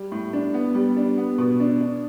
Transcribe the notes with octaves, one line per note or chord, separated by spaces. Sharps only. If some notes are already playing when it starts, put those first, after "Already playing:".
Already playing: G3
A2
D4
B3
G3
D4
B3
B2
D4
D4